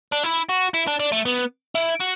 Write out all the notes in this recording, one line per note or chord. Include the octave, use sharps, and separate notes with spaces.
D4
E4
F#4
E4
D4
D4
A3
B3
E4
F#4